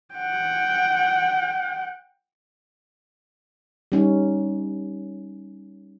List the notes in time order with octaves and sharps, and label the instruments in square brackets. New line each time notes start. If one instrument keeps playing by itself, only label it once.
[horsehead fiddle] F#5 G5
[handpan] G3 C#4 D#4